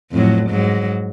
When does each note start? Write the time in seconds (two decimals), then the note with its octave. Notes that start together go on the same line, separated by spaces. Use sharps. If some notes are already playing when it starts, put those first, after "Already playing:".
0.12 F2 A2 F#3
0.50 G#2 F#3